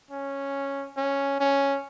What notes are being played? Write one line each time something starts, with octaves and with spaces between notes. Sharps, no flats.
C#4
C#4
C#4